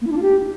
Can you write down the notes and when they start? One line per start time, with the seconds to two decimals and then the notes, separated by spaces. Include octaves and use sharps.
0.01 A#3
0.07 E4
0.12 D4
0.17 F4
0.22 G4